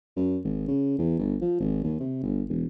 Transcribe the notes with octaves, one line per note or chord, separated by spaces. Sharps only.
F#2
G#1
C#3
E2
G1
F3
G#1
D#2
C3
G1
E1